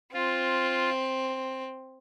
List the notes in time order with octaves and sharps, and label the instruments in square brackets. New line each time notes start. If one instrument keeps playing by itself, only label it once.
[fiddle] C4 [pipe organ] F4